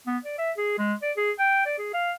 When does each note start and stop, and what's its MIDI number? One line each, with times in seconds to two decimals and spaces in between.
0.07 0.18 59
0.25 0.36 74
0.38 0.51 76
0.57 0.78 68
0.79 0.94 56
1.02 1.11 74
1.17 1.32 68
1.39 1.65 79
1.66 1.77 74
1.78 1.91 68
1.94 2.13 77